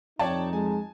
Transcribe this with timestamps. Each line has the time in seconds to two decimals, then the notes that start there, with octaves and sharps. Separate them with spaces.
0.19 F2 D#4 C#5 D5 G5 A5
0.53 G#3 G#5